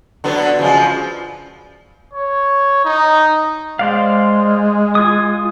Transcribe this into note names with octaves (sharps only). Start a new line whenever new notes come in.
D3 F#3 B3
C#3 F3 G#3
C#5
D#4
G#3 C5 D5 F5
F4 G#5 D#6